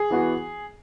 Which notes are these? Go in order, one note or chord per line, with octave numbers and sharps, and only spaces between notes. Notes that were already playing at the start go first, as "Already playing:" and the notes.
Already playing: G#4
E3 B3 F#4